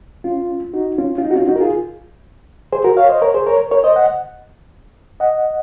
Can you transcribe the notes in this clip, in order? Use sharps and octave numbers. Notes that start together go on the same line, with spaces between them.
C#4 F4
D#4 F#4
C#4 F4
F4
D#4
F#4
C#4 F4
D#4 F#4
A#4
F4 G#4
G#4 C5
F#4 A#4
C#5 F5
C5 D#5
A#4 C#5
G#4 C5
A#4 C#5
A#4 C#5
C5 D#5
D#5 F#5
D#5 F#5